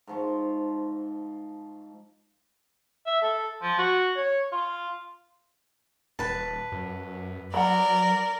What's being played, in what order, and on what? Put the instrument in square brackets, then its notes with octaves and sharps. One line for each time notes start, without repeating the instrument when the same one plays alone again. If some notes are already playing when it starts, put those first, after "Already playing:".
[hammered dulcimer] G#2 F3 C#6
[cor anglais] E5
A4
F3
F#4
C#5
F4
[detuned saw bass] D#1 [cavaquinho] B4 A5
[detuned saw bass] F#2
[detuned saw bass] F#3 [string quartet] A#4 D5 [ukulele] F#5 A#5 B5